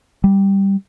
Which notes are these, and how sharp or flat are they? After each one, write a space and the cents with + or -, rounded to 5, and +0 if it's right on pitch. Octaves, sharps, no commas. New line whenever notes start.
G3 +0